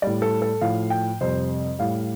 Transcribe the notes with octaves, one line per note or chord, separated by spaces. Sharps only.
A2 G3 D5
A4
A4
A2 F3 F5
G5
F2 C3 G3 C5
A2 G3 F5